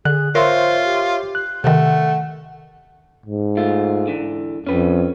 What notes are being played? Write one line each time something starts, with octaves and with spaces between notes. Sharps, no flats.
D3 G#4 F#6
F4 A#4 C5 C#5 E5 C6
G4
F#6
C3 D#3 A3 F#5
G#2
A3 F4
D3 E3
F2 C#4 B4